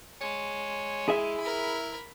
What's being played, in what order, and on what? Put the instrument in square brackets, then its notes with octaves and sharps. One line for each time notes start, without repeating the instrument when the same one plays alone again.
[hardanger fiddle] G#3 [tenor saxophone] C#5
[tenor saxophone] E4 [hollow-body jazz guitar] G#4 E5
[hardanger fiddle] A#4 B5